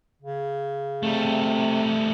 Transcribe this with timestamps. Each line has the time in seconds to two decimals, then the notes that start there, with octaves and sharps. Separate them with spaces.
0.22 C#3
1.03 C3 G3 A3